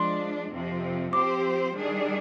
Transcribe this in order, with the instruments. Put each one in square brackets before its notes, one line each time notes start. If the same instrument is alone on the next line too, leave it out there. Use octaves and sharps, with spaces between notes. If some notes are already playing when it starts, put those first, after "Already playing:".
Already playing: [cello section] F3 G#3 D4 [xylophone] C6
[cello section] F2 C3 F3 C4
[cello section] F3 C4 G4 C5 [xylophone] D6
[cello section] D#3 G3 D4 G#4